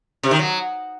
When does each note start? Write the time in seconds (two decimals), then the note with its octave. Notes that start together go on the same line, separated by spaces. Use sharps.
0.23 C3
0.31 D#3
0.39 F#3